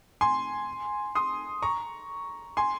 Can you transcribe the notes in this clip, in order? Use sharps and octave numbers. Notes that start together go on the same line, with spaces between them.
G#5 C6
C6 D#6
A#5 C#6
G#5 C6